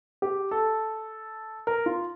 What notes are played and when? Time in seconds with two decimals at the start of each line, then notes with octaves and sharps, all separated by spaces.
0.22 G4
0.51 A4
1.67 A#4
1.86 F4